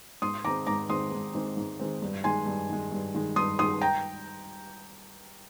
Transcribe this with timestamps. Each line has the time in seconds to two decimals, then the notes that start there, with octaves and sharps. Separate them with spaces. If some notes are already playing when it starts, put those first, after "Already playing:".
0.22 G#2 C6 D#6
0.44 D#3 G#3 C4 A#5 D6
0.67 G#2 A#5 D6
0.89 D#3 G#3 C4 C6 D#6
1.12 G#2
1.34 D#3 G#3 C4
1.57 G#2
1.80 D#3 G#3 C4
2.02 G2
2.24 D#3 G#3 G#5 C6
2.46 G2
2.69 D#3 G#3
2.92 G2
3.14 D#3 G#3
3.36 G2 C6 D#6
3.59 D#3 G#3 C6 D#6
3.81 G5 A#5